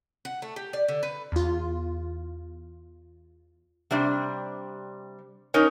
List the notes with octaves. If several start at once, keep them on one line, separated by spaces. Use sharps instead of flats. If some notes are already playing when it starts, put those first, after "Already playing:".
F#5
A3
G4
D5
D3
B4
E2 F4
C3 G3 D4
C#4 D#4 A#4 C#5